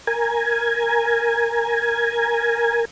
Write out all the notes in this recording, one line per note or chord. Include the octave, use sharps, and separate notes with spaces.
A#4 G#5